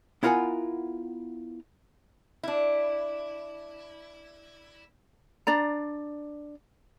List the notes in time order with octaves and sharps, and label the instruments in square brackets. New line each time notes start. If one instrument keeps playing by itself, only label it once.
[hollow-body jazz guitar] B3 E4 F4 A#4 F#5 G#5
[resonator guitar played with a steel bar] D4 E4
[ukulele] D4 D5 A#5